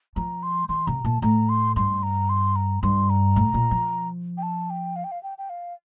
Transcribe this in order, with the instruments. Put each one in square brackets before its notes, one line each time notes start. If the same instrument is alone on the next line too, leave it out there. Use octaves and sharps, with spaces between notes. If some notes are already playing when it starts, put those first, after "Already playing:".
[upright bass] F3 [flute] A#5
[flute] C6
[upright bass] E3 [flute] C6
[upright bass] C3 [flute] A#5
[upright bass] A#2 [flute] A5
[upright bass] A2 [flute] A#5
[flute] C6
[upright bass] G2 [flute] C6
[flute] A#5
C6
A#5
[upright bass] G2 [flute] C6
[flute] A#5
[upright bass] A2
A#2
F3
[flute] G5
A5
G5
F5
G5
F5
G5
G5
F5